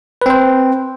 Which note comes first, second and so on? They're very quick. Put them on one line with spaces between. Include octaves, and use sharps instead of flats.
B4 C4 C5